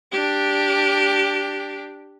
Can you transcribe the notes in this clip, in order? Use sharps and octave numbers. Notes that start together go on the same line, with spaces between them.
D4 G4